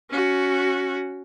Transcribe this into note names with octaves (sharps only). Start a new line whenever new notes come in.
C#4 F#4